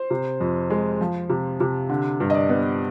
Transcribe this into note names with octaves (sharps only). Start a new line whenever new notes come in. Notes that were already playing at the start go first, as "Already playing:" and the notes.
Already playing: C5
C3
F2
G#3
F3
C3
C3
D3
G2
D#5
D5
B3